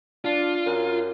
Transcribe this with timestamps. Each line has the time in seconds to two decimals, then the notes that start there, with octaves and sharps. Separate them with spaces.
0.25 D4 F4
0.66 F#2